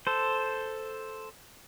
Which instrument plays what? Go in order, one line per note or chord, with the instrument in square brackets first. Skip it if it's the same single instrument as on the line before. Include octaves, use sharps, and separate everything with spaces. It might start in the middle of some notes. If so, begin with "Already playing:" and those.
[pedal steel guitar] A4 C5